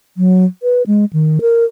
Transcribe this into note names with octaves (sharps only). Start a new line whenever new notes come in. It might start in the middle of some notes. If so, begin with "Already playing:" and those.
F#3
B4
G#3
D#3
A#4